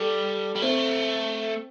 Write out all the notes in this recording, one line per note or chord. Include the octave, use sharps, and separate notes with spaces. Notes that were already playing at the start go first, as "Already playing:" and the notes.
Already playing: G3 A4
G3
A3 C4